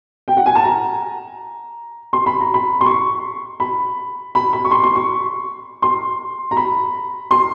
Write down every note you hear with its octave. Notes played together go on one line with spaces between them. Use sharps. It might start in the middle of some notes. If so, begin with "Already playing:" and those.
G5
F#5
G#5
A5
A#5
C6
B5
A#5
B5
C6
C#6
B5
B5
B5
C#6
C6
C6
C#6
C6
A#5
B5
C6